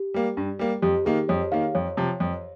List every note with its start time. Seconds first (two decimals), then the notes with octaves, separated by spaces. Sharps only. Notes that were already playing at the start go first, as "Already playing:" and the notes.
Already playing: G4
0.14 G3 A#3
0.37 G2
0.59 G3 A#3
0.82 F2 G4
1.05 D#3 A#3 G#4
1.29 F2 C#5
1.52 D#3 A#3 F5
1.75 F2 C#5
1.97 C3 F3
2.20 F2